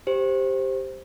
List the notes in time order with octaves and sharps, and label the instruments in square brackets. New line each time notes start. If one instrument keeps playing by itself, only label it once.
[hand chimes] G4 C5